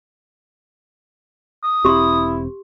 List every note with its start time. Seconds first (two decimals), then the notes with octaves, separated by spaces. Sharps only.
1.63 D#6
1.85 E1 C4 E4 G4 C6